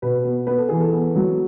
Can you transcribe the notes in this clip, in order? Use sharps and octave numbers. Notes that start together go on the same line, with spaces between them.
B2 B4
B3
B3 B4
A4
E3 G#4
A4
B3
F#3